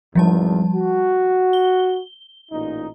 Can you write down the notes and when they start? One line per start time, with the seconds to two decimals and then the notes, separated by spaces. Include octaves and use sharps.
0.15 G#1 E2 F3 G3 A5
0.73 F#4
1.53 G7
2.51 A1 A#2 D#4